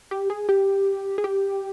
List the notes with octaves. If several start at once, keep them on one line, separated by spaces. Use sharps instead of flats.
G4
G#4
G4
G#4
G4